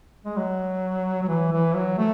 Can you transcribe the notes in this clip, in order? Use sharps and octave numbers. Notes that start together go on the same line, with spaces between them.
G#3
F#3
F#3
E3
E3
F#3
A3